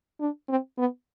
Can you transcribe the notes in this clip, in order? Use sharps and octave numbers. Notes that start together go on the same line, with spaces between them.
D4
C4
B3